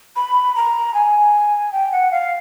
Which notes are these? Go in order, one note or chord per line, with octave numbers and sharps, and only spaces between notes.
B5
A#5
G#5
G5
F#5
F5